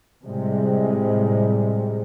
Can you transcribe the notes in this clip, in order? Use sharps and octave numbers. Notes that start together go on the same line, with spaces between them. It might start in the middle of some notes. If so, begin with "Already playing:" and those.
A2 C3 G3 G#3